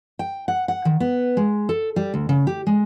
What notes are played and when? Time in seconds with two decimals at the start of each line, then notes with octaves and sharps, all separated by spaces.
0.19 G5
0.48 F#5
0.68 F#5
0.85 D#3
1.00 B3
1.37 G#3
1.69 A4
1.96 G3
2.14 D2
2.29 C#3
2.47 G4
2.67 G#3